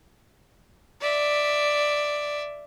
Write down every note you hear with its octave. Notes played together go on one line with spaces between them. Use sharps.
D5 E5